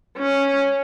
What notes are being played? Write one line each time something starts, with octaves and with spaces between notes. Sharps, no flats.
C#4